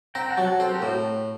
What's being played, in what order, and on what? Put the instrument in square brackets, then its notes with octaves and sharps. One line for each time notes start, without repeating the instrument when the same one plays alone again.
[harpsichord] C4 [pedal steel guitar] G5 A#5
[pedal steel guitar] F#5 A5
[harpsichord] F#3
[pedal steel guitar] F#5 A5
[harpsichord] C4 [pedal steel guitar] A4 C5
[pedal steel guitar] G4 A#4
[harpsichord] A2 [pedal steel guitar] F#4 A4